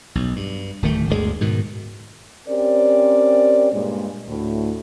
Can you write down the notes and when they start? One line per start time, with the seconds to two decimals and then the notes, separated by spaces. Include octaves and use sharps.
0.15 B1
0.36 G2
0.82 D1 D#3 A3
1.09 G1 D2 C#3 G#3
1.41 G#2 B2 D#3
2.48 C4 C#4 G4 A#4 C5 D5
3.72 G2 A#2 G#3
4.28 D2 A2